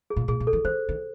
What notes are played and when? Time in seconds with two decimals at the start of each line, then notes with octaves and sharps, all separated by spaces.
0.10 G#4
0.16 A#2
0.28 A#2 G#4
0.40 A#2
0.47 A4
0.53 E3
0.65 D#3 C5
0.89 D#3